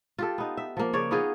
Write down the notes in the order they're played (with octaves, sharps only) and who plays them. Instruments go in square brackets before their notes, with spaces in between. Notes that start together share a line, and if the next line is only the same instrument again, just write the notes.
[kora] F4 G4 A4
B3 D#4
E5
F3 A#3
C#3 C#5 D5
B3 D#4 F4 G#4